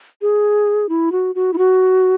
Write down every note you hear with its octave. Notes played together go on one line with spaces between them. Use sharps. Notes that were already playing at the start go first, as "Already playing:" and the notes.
G#4
E4
F#4
F#4
E4
F#4